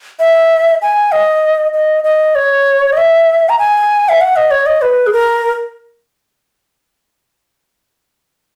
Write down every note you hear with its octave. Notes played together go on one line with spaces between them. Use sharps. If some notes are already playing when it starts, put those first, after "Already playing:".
E5
G#5
D#5
D#5
D#5
C#5
D#5
E5
A#5
G#5
E5
F#5
D#5
C#5
D#5
B4
G#4
A#4